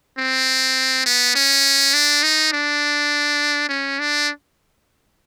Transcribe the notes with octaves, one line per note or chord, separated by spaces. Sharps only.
C4
B3
C#4
D4
D#4
D4
C#4
D4